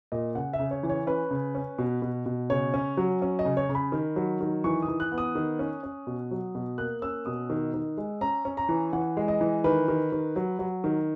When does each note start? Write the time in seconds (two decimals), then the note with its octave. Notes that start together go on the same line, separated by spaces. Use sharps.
0.12 A#2 D#5
0.35 C#3 F#5
0.53 E5
0.59 C#3
0.71 C#5
0.83 E3
0.89 C#5
1.07 C#4 B4
1.31 C#3
1.55 C#4
1.78 B2
2.02 B2
2.26 B2
2.50 C#3 C#5
2.74 C#4
2.97 F#3
3.22 C#4
3.39 D#5
3.45 C#3
3.57 C#5
3.69 C#3
3.75 B5
3.92 D#3
4.16 F#3
4.41 D#3
4.64 E3 C#6
4.82 D#6
4.88 E3
5.00 F#6
5.12 B3
5.18 D#6
5.35 D#3
5.59 C#4
5.83 C#4
6.07 B2
6.31 F#3
6.55 B2
6.78 A#3 F#6
7.02 C#4 E6
7.26 B2 D#6
7.50 D#3
7.74 D#3
7.97 G#3
8.21 C#4 A#5
8.45 C#4
8.57 A#5
8.69 E3
8.93 E3 F#5
9.17 G#3
9.28 D#5
9.41 E3
9.64 D#3 B4
9.88 D#3
10.12 D#3
10.36 F#3
10.59 F#3
10.84 D#3